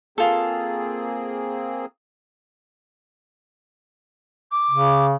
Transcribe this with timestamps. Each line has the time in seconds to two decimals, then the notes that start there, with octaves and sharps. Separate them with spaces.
0.18 A#3 C4 F4 G#4 A4
4.52 D6
4.71 C#3